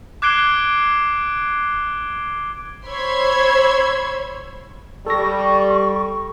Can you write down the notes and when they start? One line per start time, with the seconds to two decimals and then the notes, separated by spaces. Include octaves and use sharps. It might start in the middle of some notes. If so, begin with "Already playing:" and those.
0.22 D6 F#6 G#6 C7 D7 G7
2.86 C5 C#5 B5 C6 E6 G#6
5.06 G3 A4 C#6 A#6